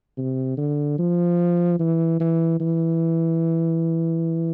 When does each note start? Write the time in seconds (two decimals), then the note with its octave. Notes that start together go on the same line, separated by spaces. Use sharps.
0.17 C3
0.57 D3
0.98 F3
1.79 E3
2.20 E3
2.60 E3